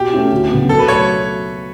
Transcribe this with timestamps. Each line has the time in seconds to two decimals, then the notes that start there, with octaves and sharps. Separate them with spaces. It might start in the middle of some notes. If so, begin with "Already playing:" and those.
Already playing: B2 G4
0.13 A3 C#4 E4
0.32 D2
0.50 C#3 F#3 B3
0.69 B2 A4
0.79 B4
0.88 F#3 A3 C#5